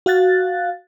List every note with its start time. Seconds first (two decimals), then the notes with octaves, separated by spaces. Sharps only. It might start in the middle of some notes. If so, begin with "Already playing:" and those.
0.06 F#4 F5 F#6 A6